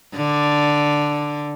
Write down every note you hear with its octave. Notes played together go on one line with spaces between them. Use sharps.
D3